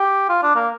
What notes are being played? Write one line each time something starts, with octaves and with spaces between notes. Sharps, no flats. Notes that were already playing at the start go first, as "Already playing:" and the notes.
Already playing: G4
F4
D4
A#3